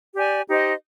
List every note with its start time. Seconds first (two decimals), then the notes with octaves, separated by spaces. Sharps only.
0.14 G4 D5 G#5
0.47 D#4 G4 C5 D#5